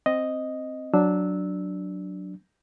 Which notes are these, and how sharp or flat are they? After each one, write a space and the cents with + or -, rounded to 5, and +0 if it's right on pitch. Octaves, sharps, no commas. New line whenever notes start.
C4 +0 D#5 +0
F#3 +0 D4 +0 E6 -15